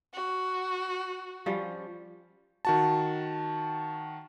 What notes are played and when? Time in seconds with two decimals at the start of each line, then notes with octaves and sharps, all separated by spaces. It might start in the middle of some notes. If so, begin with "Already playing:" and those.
0.14 F#4
1.46 F3 G3 C#4
2.65 D#3 F#4 A5